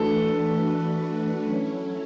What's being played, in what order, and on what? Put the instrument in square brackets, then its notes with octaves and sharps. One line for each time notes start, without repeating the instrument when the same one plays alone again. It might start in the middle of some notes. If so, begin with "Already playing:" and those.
Already playing: [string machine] E3 A3 D4 F#4 B4 [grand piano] A4
[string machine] F#3 C#4 E4